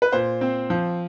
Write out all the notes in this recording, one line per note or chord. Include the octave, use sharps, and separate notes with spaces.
B4
A#2 C5
C4
F3